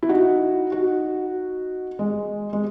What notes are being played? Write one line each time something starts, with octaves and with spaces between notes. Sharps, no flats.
E4
D#4 F#4
D#4 F#4
G#3
G#3